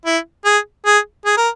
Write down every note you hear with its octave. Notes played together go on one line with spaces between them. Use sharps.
E4
G#4
G#4
G#4
A#4